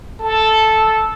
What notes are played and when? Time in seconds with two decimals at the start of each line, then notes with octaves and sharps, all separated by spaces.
0.20 A4